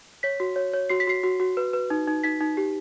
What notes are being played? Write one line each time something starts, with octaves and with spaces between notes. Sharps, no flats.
C#5 B6
F#4
C#5
C#5
F#4 C7
B6
F#4 C7
F#4
F#4
B4
B4
D#4
D#4
D#4 B6
D#4
G4